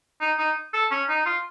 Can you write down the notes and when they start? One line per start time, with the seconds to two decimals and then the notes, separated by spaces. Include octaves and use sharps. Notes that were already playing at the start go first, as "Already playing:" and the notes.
0.21 D#4
0.39 D#4
0.74 A4
0.91 C#4
1.09 D#4
1.26 F4